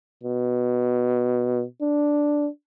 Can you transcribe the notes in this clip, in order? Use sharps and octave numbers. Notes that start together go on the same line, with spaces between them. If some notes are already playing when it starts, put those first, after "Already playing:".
B2
D4